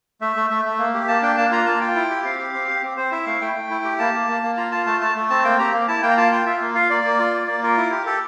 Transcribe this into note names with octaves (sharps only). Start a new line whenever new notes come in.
A3 E5
A3
A3 E5
A3
A#3
G4
A#3 A5
D4 G5
A#3 A5
F4 A#5
A#3 A5
F4 G5
E4
G4
C4 F5
G4
C4
G4
C4
C4 C5
E4 E5
A3 F5
A3 G5
A3
E4
G4
A#3 A5
A#3
A#3
A#3
F4 A#5
F4 A5
A3 A5
A3 A5
A3
C4 A5
A#3 G5
G4 A#5
A#3
E4 A5
A#3 G5
A#5
F4 A5
F4 G5
F4 E5
A#3
F4 F5
A#3 D5
A#3
F4
A#3
A#3 D5
F4 A#4
E4
G4
G4 A4